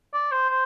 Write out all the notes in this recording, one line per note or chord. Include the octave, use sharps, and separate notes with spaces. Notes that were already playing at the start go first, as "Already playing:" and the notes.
D5
C5
C5